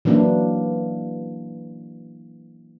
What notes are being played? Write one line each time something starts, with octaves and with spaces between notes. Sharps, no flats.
E3 F#3 A#3 D4 E4